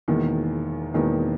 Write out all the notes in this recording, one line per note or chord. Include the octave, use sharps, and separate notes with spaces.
E1 E2 D#3 A#3
E1 E2 D#3 A#3